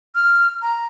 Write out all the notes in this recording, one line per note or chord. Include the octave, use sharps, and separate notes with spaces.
F6
A#5